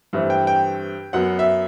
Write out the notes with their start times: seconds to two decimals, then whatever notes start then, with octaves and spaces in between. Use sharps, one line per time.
0.13 G2 E3 A3 C4
0.30 G5
0.47 G5
1.13 F#2 F#3 B3 F#5
1.39 E5